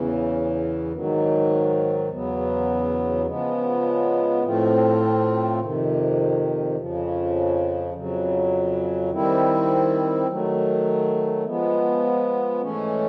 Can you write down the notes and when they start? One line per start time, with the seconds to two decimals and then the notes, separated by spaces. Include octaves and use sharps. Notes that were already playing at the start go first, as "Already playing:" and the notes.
Already playing: E2 C#3 E3
0.92 G#2 D#3 F#3
2.09 E2 C#3 F#3 B3
3.26 C#3 F3 G#3 B3
4.43 A2 F3 A3 C4 F4
5.60 F2 C3 D#3
6.77 F2 C#3 F3
7.94 F2 C#3 F#3
9.11 D#3 G3 C4 E4
10.27 D#3 F#3 A3
11.45 F3 G#3 B3
12.61 G#2 E3 A3 C#4